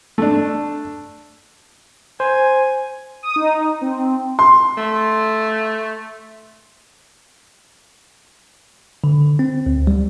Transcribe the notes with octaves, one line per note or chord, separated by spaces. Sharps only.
A3 D4
C5 G#5
D#6
D#4
C4
C6
A3
D3
C4
D2
G3